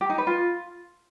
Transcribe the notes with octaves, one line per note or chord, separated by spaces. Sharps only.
G4
D#4
B4
F4